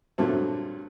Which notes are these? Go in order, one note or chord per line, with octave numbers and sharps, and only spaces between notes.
G2 A#2 D3 F#3 A3 C4